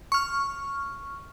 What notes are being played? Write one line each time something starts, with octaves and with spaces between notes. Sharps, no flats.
C#6 F6